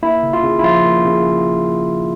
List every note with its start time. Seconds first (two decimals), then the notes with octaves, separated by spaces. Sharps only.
0.03 A#3 E4
0.23 C#3
0.33 F4
0.43 C#3
0.59 E4
0.64 F3 F4
0.84 A#3
1.05 C#3